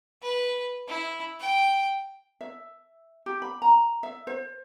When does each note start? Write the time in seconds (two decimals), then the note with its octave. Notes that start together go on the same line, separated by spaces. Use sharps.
0.22 B4
0.88 E4
1.40 G5
2.41 E5
3.26 G4
3.42 B5
3.62 A#5
4.03 E5
4.27 C5